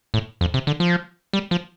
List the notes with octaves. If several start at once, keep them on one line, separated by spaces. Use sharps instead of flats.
A2
F2
C3
D3
F3
G3
F3